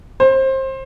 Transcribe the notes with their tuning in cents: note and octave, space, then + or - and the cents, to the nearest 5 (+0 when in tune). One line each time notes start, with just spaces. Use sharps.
C5 +25